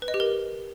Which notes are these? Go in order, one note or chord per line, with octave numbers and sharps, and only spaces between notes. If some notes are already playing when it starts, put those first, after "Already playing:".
B4
D#5
G4
A#4